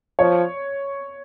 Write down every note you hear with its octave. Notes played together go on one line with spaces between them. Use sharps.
F3 C#5